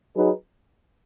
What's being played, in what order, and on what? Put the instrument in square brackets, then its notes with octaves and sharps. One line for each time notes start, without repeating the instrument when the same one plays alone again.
[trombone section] F#3 D#4 G#4 B4